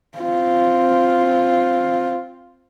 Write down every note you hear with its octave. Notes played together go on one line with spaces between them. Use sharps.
C4 F4